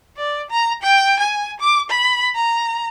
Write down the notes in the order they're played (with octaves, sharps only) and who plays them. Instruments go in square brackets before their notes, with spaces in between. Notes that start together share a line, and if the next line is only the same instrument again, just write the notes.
[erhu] D5
A#5
G5
G#5
D6
B5
A#5